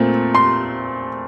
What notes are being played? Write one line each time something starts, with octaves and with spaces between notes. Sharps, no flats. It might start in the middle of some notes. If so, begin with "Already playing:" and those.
Already playing: A#2 A3 C4
C6